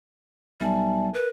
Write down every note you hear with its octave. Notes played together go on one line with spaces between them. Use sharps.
B1 G3 E5 G#5 A5
A#4 B4